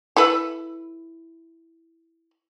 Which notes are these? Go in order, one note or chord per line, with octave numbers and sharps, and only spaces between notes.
E4 A4 B4